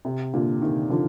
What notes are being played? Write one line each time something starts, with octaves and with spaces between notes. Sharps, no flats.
C3
A#2 D3
C3 D#3
D3 F3